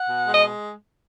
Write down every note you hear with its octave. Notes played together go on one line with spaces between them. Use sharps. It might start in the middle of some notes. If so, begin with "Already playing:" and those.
Already playing: F#5
B2
G#3
D#5